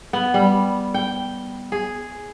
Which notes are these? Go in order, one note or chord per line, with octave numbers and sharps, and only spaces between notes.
B3
G3
G5
G#4